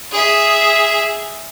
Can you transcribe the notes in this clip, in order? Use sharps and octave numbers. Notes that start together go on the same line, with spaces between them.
G#4 E5